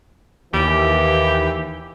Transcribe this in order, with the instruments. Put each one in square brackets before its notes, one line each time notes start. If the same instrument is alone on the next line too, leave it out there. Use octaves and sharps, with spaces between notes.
[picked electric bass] D#2 [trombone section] E3 [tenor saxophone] G4